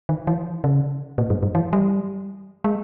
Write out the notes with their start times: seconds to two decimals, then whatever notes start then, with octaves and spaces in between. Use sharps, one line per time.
0.09 D#3
0.27 E3
0.64 C#3
1.18 A#2
1.30 G2
1.43 G2
1.55 E3
1.73 G3
2.64 G#3